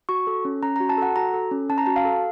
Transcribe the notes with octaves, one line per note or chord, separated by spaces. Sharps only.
F#4 C#6
A4
C#4
C#4 A#5
A#5
F#4
A5
A4 F#5
F#4 A#5
A4
C#4
C#4 A5
A#5
F#4 A5
F5
A4